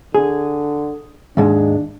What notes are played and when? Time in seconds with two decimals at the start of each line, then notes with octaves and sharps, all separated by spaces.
0.15 D3 G#4
1.37 D#2 G#2 G#3 D4